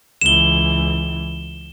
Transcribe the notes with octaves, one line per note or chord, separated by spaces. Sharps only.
C#2 E3 E7 G7